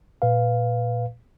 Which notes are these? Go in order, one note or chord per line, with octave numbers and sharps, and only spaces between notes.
A#2 B4 F5